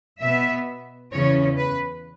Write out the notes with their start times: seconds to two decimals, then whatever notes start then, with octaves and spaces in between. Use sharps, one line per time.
0.22 B2 B3 E5
1.12 E2 C#3 E3 C#4 C#5
1.58 B4